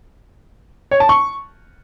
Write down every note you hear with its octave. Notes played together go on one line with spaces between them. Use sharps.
C#5
A5
C#6